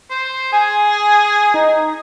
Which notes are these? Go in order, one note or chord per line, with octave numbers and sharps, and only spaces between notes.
C5
G#4 G#5
D#4